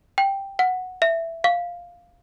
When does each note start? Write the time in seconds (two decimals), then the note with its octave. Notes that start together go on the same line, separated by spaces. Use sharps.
0.18 G5
0.59 F#5
1.02 E5
1.44 F5